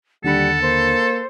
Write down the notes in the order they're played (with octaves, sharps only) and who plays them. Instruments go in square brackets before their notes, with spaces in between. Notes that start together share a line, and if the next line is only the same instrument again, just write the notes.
[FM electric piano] D#2 D3 B5 [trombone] G3 [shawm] A4 [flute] F#5
[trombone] A#3 [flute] C5